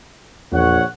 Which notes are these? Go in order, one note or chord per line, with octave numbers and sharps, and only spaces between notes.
A#1 E2 C#5 F#5